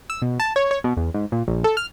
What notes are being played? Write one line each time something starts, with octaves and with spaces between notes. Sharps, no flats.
E6
B2
A5
C#5
C#5
B2
E2
G#2
A#2
A#1
A4
F6